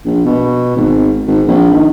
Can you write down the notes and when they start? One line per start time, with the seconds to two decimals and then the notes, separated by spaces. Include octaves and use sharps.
0.05 A#1
0.25 B2
0.77 G#1
1.27 G#1
1.48 A#1
1.73 D#3